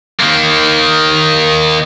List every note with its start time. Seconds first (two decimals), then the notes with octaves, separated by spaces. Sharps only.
0.20 D#3 A#3